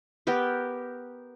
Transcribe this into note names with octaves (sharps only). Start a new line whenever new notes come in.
B3 G4 A#4